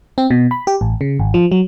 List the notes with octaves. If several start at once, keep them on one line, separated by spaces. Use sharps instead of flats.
C4
B2
B5
G4
A1
C#3
G#1
F3
F#3